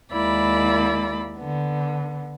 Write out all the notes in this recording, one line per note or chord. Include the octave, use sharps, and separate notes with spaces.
D#2 G#3 A#3 E4 D5 B5
D3 B3